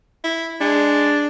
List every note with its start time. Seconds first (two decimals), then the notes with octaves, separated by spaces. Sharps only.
0.24 E4
0.61 G#3 D4